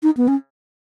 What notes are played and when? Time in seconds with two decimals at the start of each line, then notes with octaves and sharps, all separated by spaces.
0.03 D#4
0.17 B3
0.28 C#4